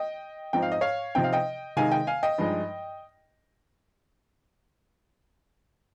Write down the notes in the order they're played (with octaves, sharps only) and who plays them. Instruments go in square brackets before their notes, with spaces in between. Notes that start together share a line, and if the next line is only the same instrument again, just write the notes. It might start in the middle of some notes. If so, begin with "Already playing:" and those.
Already playing: [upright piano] D#5 G5
G#2 F3 C4 D#4 G5
F5
D#5
C#5 F5
C3 F3 C4 D#4 G5
F5
D#5 G5
C3 D#3 G#3 D#4 F5 G#5
D#5 G5
F5 G#5
D#5 G5
G2 F3 G#3 D#4